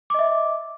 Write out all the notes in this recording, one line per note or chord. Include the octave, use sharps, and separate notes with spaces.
D#5 E5 D6